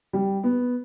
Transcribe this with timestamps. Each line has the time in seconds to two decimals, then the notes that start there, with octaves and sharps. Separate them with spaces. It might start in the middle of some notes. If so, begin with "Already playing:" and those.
0.13 G3
0.44 B3